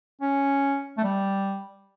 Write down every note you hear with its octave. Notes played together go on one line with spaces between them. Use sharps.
C#4
A3
G3